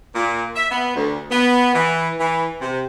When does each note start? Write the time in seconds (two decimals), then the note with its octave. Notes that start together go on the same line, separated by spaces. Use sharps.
0.15 A#2
0.56 E5
0.71 B3
0.96 D2
1.31 B3
1.74 E3
2.19 E3
2.61 C3